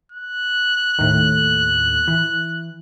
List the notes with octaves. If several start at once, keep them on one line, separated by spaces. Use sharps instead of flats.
F#6
D#2 A2
E3